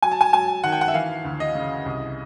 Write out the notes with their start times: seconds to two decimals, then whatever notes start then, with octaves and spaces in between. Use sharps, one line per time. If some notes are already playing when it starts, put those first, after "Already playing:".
0.02 F#3 G#5
0.12 A5
0.21 G#5
0.33 F#3 G#5
0.64 D#3 F#5
0.72 G5
0.81 F#5
0.88 E5
0.94 E3 F5
1.25 D2
1.40 D#5
1.55 C#3
1.86 C2